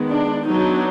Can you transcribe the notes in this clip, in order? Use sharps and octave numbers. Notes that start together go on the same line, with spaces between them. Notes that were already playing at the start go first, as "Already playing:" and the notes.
Already playing: D#3 G#3 B3
D4
F#3 B3 D4 D#4